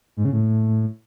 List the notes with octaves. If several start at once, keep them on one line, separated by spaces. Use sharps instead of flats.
G#2
C#3
A2